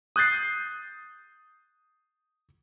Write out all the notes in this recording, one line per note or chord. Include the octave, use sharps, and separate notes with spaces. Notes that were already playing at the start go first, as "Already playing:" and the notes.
D#6 F#6 G6 A6 C7